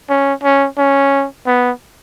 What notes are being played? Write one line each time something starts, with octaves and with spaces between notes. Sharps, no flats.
C#4
C#4
C#4
B3